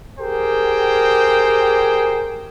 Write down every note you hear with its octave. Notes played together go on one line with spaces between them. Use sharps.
G4 G#4 A#4 C5 G5